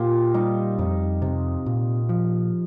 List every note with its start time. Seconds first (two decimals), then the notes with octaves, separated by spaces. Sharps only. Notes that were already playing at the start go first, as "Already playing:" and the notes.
Already playing: A#2 F4 G4
0.34 G3 D#4
0.78 F2 D#4
1.22 C3
1.66 A#2
2.09 F3